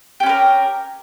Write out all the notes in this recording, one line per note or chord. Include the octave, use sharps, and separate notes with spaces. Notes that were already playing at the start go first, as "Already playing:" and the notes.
C#4 G4 A#4 B4